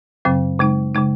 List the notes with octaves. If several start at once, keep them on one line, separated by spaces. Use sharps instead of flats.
F#2 C#3 F#3 C4
C#3 G#3 D#4
C#3 G#3 D#4